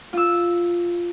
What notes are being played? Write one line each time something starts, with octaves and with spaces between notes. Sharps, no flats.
F4 E6